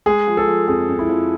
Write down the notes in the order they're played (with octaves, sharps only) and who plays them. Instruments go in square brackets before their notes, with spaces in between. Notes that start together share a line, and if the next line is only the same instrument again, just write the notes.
[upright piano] G#3 [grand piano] G#4
[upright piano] F3
[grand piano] A4
[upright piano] F3
[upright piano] F2 [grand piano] G#4
[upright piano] F2
[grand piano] E4
[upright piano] F3